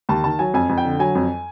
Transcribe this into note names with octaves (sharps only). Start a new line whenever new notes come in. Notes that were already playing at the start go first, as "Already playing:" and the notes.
D#2 A5
D#3 A5
F#3 G#5
F2 G#5
F2
G5
D3
F#3 G#5
F2